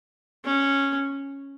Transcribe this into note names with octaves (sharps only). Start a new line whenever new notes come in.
C#4